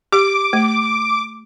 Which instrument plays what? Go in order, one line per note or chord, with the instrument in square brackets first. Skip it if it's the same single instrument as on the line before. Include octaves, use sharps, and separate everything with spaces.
[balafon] G4 [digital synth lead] D6
[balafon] A3